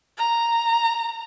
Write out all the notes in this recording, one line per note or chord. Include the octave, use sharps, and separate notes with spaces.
A#5